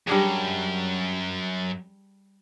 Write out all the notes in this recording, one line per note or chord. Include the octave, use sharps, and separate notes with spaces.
F#2 G3 D4 G#4